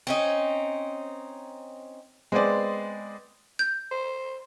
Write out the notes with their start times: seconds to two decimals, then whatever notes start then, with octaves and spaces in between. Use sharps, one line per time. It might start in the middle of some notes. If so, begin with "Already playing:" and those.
0.07 C4 C#4 D#4
2.32 G#3 B3 C4 G#4 D5
3.59 G6
3.91 C5